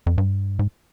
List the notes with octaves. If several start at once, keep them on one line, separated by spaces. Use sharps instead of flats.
F2
G2
G#2